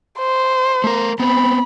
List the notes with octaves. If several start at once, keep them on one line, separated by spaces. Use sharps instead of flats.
C5
A3 A#4
B3 C4 B5